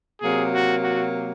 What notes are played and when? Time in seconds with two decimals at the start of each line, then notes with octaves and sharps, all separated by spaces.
0.21 C3 F#3 A#3 G#4
0.52 F#4
0.83 F#4